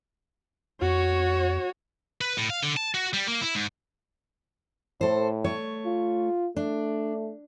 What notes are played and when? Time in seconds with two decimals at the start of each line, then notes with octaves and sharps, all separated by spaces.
0.82 F2 F#4 C#5
2.21 B4
2.37 A2
2.50 F5
2.63 D3
2.77 A5
2.94 F#4
3.14 G3
3.28 A#3
3.41 E4
3.55 G#2
5.01 A2 A4 C5
5.44 A3 C#5
5.85 F4
6.56 A3 D4